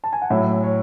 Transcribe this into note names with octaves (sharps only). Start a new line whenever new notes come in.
A5
G#5
F#5
A2 F#3 E5
C#5